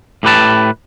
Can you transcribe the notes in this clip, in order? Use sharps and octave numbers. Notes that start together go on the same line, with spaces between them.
A2 G4 B4 A5